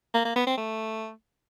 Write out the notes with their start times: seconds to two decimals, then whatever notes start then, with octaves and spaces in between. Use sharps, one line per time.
0.14 A#3
0.25 A#3
0.36 B3
0.47 C4
0.58 A3